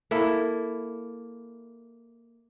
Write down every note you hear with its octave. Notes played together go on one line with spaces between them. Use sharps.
A#3 E4 A4